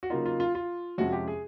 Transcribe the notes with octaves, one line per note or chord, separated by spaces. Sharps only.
F#4
C#3 F#3 A#3 D#4 F4
F4
F4
F4
F2 C3 F3 G#3 C#4 F#4
G4
G#4